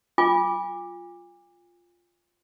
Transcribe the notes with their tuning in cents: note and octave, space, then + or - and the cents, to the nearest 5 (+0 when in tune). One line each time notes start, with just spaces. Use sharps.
F4 +0 G#5 -40 D6 +0